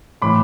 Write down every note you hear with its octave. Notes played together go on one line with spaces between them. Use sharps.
A2 E3 B5 D6